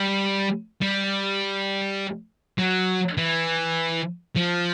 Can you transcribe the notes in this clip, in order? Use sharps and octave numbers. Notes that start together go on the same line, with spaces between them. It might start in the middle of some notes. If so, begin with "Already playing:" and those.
Already playing: G3
G3
F#3
E3
F3